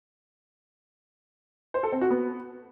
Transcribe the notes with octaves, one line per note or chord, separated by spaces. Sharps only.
C5
A4
C4
F#4
B3